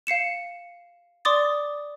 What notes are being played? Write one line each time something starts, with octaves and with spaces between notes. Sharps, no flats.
F5 C7 C#7 E7
D5 C6 D6 D#6 A6